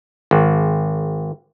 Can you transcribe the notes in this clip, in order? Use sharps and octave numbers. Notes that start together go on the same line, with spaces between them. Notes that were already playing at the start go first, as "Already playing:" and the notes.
G#1